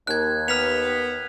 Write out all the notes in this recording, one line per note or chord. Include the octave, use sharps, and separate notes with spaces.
D#2 F#6 G#6
B3 F6 B6 F7